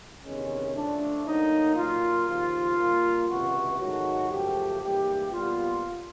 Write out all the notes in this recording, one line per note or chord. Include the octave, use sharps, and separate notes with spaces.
E2 C3 D#3 G#3 B3 C#4
A2 F3 A3 D4
A2 F#3 A#3 D#4
A#2 F#3 A#3 F4
D#2 C#3 F3
A#2 G3 A#3
C#2 C3 E3 F#4
G#2 D#3 F#3 A3 F#4
F#2 C#3 F3 A3 G4
G#2 E3 G3 A#3 G4
A#2 G3 B3 F4